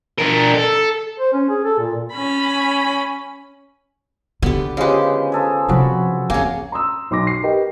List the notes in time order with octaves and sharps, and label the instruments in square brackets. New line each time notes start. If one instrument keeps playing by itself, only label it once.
[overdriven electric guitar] D4 A#4
A4
[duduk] C5
C#4
G#4
A4
A#2
[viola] C#4 B5
[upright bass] D3 [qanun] B3 G4
[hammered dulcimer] C#3 F3 B4 [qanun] G#3 G4
[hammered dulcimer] G#4 A4 C5
[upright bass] C3 F3 [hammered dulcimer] F#4 B5
[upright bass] F2 [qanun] C#3 A#3 [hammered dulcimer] G#5
[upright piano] A#5 C6 D#6 E6
B1 C6 D6 A#6
C#6 C7
G4 A#4 B4 D#5 G5